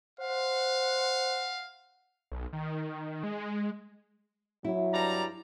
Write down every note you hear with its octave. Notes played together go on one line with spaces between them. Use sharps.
C5 F5 F#5
B1
D#3
G#3
F#3 E4
G2 D5 A#5